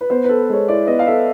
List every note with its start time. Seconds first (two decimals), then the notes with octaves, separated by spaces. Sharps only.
0.01 B4
0.10 B3 C5
0.24 B4
0.29 A4
0.49 G#3 C#5
0.68 E4 D5
0.87 B3 D#5
0.99 F5
1.07 A4 E5